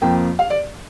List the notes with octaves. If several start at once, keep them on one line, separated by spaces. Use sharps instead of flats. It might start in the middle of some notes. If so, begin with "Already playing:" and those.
F2 F3 A#3 G5
F5
D5